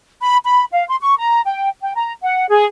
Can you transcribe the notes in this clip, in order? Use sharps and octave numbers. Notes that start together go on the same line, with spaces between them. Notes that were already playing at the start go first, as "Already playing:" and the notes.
B5
B5
F5
C6
C#6
A#5
G5
G5
A#5
F#5
G#4